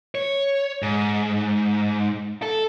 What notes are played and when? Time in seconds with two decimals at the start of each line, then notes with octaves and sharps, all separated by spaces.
0.15 C#5
0.82 G#2
2.42 A4